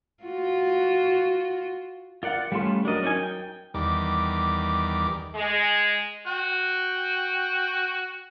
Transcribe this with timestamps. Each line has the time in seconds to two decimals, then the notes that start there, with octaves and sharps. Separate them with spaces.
0.24 F4 F#4
2.23 F4 A#4 D5 F5 F#5
2.52 G3 A3 C#4 F4 A4 C6
2.85 F#3 D4 A#4 D#5 A6
3.03 C#4 D#4 G#5
3.15 G5
3.74 E2 D#3 G3 D6
5.35 G#3
6.27 F#4 G5